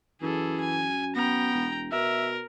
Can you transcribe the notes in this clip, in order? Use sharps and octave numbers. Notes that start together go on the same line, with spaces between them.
F#2 E3 G#4 A4
G#5
B3 G5 A#5
E1
B2 A#4 E5